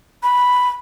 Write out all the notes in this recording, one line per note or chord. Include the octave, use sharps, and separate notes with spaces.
B5